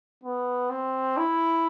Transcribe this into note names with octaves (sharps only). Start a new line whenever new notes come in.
B3
C4
E4